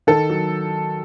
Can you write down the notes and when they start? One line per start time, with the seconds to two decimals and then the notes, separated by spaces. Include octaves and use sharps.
0.07 D#3 A4
0.30 F#3